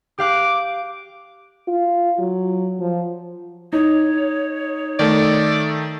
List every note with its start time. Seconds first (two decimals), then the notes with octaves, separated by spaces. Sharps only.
0.18 G4 F5 D6 F#6
1.68 F4
2.20 F#3
2.80 F3
3.73 D#4 C#5
4.99 D#3 A3 A4 D5